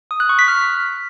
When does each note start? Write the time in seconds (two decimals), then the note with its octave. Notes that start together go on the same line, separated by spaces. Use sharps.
0.11 D#6
0.20 F#6
0.29 C#6
0.39 B6
0.48 F6